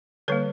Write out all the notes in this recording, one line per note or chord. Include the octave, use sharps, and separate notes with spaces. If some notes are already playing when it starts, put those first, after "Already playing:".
D3 G3 A#3 B4 C#5